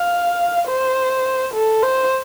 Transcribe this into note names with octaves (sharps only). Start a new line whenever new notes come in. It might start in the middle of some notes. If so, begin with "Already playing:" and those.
Already playing: F5
C5
A4
C5